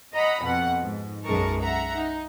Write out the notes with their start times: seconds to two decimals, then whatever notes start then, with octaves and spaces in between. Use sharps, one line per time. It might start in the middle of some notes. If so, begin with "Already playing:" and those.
0.12 D#5 F#5 A#5 B5
0.42 F2 B2 F#5
0.84 G#2
1.23 B1 F#2 G#3 A#4 A5 C#6
1.60 E5 F#5 A#5
1.95 D#4